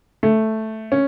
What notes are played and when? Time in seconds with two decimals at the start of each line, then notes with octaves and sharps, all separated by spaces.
0.23 A3
0.92 C#4